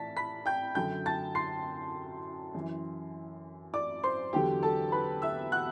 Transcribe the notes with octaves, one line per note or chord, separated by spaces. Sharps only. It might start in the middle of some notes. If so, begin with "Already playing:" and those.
Already playing: A2 E3 D5 A5 A6 B6
B5 B6
G5 G6
F#2 D3 F#3 G5 G6
A5 A6
C6 C7
F#2 E3
D5 D6
C5 C6
E2 D3 F#3 G4 G5
A4 A5
B4 B5
E5 E6
F#5 F#6